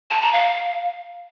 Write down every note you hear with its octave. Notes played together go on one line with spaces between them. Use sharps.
A5
A#5
F5